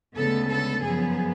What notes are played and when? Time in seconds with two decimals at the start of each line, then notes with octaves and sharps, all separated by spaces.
0.15 D2 C#3 G#3 B3 A4
0.50 A4
0.83 F#2 F3 B3 G#4